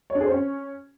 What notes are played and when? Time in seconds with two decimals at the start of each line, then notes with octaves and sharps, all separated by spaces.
0.10 C#5
0.15 D4
0.21 G#4
0.26 C5
0.31 C#4